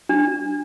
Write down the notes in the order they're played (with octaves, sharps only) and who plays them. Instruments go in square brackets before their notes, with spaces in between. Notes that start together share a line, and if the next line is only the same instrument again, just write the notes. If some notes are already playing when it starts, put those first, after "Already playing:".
[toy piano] D4